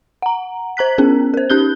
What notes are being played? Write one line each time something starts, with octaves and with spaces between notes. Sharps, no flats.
F#5 A#5
C5 A#5 F#6 B6
B3 C#4 G#4 A#4
A#4 C5
C#4 D#4 G4 F#6 G6 G7